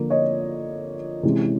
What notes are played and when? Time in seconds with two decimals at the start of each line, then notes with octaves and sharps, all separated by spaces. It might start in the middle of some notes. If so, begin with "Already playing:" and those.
Already playing: D3 F3 A#3
0.10 C#5 D#5
1.23 C3 E3 G#3 C#4